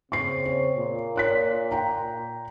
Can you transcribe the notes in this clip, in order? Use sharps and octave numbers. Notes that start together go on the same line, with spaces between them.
C#3 C4 C#6 C7
C#5
A#2
C#5 F#6 B6
G5 A#5